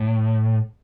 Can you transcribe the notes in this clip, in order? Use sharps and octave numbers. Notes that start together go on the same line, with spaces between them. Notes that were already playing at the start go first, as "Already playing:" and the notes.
Already playing: A2